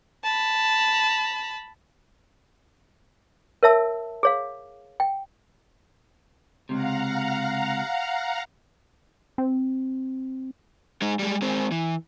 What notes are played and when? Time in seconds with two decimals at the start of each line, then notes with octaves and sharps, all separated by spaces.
0.24 A5 B5
3.63 A#4 C#5 E5 A5 E6
4.23 G#4 C#5 F5
5.00 G5
6.69 C#2 C3 F5 F#5 A#5
9.38 C4
11.02 G#3 D#4
11.19 G3 G#3
11.42 G#3 C4
11.71 E3